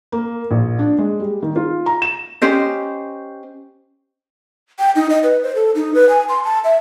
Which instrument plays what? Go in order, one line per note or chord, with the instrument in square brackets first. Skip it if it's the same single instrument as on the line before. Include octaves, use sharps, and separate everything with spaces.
[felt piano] A#3
A#1
D4
G#3
G3
D#3
F4
A#5
E7
[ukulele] C#4 G4 C5 D#5
[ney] G5
D#4
D#5
B4
C5
A4
D#4
B4
G#5
C6
A5
E5